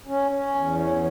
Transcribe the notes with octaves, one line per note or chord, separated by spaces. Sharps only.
C#4
C#4
E2
C#4